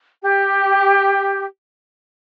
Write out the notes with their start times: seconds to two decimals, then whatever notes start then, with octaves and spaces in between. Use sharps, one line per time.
0.23 G4